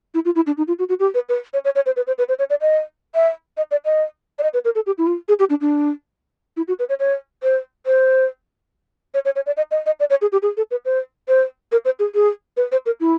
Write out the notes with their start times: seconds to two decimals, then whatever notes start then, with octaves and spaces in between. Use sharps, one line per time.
0.14 E4
0.25 F4
0.35 E4
0.47 D4
0.57 D#4
0.68 F4
0.79 F#4
0.89 F#4
1.00 G4
1.14 B4
1.29 B4
1.53 C#5
1.65 C#5
1.75 C#5
1.86 C5
1.96 B4
2.07 C5
2.18 B4
2.29 C5
2.39 C#5
2.50 D5
2.61 D#5
3.15 E5
3.57 D#5
3.71 D5
3.85 D#5
4.39 D5
4.43 D#5
4.54 B4
4.65 A#4
4.75 A4
4.86 G4
4.98 E4
5.07 F4
5.28 G#4
5.39 G4
5.50 D4
5.61 D4
6.57 E4
6.68 F#4
6.79 B4
6.89 C#5
7.00 C#5
7.43 C5
7.86 C5
9.14 C#5
9.25 C#5
9.36 C#5
9.46 D5
9.57 D#5
9.71 D#5
9.86 D#5
10.00 D5
10.10 C#5
10.22 G#4
10.32 G4
10.42 G#4
10.57 A4
10.71 B4
10.85 C5
11.28 C5
11.72 A#4
11.85 C5
11.99 G#4
12.15 G#4
12.57 B4
12.72 C5
12.86 A#4
13.00 E4